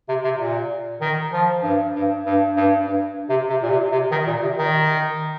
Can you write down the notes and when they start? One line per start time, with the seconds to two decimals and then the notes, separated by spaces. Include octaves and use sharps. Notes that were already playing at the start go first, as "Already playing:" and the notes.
0.09 C3
0.24 C3
0.39 A#2
1.01 D#3
1.33 F3
1.63 G2
1.95 G2
2.26 G2
2.56 G2
2.87 G2
3.29 C3
3.50 C3
3.63 A#2
3.70 C3
3.92 C3
4.11 D#3
4.27 A#2
4.42 C3
4.58 D#3